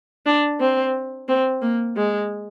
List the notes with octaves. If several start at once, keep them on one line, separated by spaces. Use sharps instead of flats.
D4
C4
C4
A#3
G#3